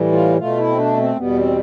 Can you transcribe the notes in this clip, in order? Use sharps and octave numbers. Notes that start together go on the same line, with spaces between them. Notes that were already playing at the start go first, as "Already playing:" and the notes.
Already playing: A2 E3 G3
F4
B2 A3 F4
E4
C4
D4
C4
E2 B2 G3 B3
C4